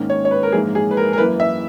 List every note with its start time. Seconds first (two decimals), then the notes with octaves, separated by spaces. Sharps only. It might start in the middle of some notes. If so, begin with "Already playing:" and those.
Already playing: G#2 D#3 A#3 C#4
0.10 C#5
0.25 C#5
0.31 B4
0.43 A#4
0.52 A#1 G#2 E3 A#3 E4 G#4
0.75 G#4
0.91 B4
0.97 A#4
1.13 A#4
1.18 F#2 E3 A#3 B4
1.40 E5